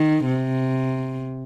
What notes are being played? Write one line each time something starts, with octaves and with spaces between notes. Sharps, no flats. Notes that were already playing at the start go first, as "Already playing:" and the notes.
Already playing: D#3
C3